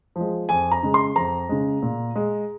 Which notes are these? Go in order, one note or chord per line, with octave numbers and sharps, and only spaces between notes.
F3 G#3
F2 G#5
A#5
C#3 G#3
C6
F2 A#5
C#3 G#3
A#2
G#3